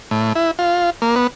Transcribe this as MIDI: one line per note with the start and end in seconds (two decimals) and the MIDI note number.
0.11 0.33 45
0.36 0.51 64
0.59 0.90 65
1.02 1.15 58
1.16 1.27 59